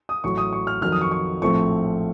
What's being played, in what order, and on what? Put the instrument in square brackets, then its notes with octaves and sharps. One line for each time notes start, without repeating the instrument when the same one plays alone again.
[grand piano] D#6
A1 A2 F#3 C#6
D#6
C#6
F6
F2 D#3 F#3 F6
D#6
C#6
C#6
A#1 A2 F3 A3 C4 C#6